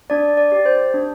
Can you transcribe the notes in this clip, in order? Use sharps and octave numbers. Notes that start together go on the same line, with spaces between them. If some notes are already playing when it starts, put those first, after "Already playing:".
D4 D5
D5
G4
C5
D4